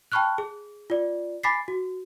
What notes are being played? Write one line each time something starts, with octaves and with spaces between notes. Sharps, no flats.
G5 A5 B5 C#6 F6 F#6
G#4
F4 D5
G#5 B5 D6 A6 B6 C7
F#4